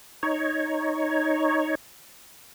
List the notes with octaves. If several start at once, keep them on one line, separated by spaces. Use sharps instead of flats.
D#4 C#5